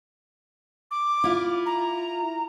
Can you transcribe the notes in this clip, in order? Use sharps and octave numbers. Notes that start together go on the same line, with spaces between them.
D6
E4 F4
A#5